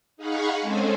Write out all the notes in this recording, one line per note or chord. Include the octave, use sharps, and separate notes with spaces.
D#4 G#4 F5 F#5 B5 C#6
G#3 C4 C#4 A4 C5 G#5